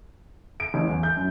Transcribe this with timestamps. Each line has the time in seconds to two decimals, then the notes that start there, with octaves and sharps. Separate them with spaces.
0.60 D7
0.74 A1
0.89 E2
1.03 G6
1.16 F#2